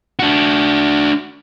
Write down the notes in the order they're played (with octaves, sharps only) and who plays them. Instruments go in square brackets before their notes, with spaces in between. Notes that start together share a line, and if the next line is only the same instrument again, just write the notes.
[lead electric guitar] D4 F#4